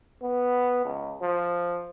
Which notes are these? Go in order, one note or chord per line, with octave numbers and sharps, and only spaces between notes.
B3
C#2
F3